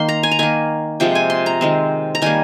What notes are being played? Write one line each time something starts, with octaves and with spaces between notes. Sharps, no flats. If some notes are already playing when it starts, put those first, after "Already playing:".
Already playing: D#3 A#3 C6
A#5
G#5
A#5
D#3 A#3 G#5
C3 F3 G#3 G5
G#5
C6
A#5
D#3 G#3 C4
A#5
D#3 G3 A#3 G#5